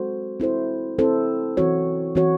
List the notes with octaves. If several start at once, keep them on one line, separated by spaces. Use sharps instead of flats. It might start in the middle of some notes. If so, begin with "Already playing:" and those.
Already playing: G#3 C4 F#4 A4 C5
C4 E4 A4 C5
C4 E4 A4 C5
E3 C4 F#4 C#5
E3 C4 F#4 C#5